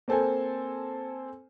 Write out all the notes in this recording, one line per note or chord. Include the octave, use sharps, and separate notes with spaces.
A#3 C4 A4 C5 G#5